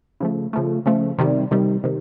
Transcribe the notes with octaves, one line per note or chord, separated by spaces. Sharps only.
C#3 F3 A3
C#3 F3 A3
C#3 F3 A3
C3 D#3 G3
C3 D#3 G3
C3 D#3